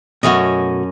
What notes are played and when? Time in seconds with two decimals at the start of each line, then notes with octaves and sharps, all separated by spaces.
0.23 F#2 B2 A3 C#4 F#4 D#5